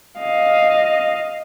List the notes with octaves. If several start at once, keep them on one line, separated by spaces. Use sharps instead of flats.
D#5 F5